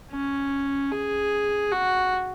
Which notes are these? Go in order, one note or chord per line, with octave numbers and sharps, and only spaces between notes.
C#4
G#4
F#4